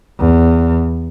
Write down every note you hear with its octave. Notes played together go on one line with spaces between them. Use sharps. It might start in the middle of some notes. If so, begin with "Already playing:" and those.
E2